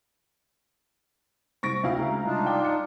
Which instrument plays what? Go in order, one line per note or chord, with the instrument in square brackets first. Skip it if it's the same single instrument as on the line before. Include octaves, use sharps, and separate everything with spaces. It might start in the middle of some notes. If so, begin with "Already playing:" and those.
[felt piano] C2 C3 [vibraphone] C5 [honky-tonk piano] C#6 A#6 D7
[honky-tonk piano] D2 E4 F5 [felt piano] C4 F4 G5
[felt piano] C#3 [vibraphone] G#3 E5 A#5
[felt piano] C2 [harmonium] D4 D#4 F4
[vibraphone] D5 [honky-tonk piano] G5 D6
[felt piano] C#7